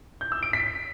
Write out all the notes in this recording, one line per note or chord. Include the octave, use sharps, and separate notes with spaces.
G6
E6
D7
B6